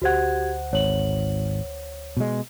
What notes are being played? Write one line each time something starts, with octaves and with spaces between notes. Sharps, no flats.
D2 F#4 G4 C5 F#5 G#6
G#1 C#5 F#7
B2 G#3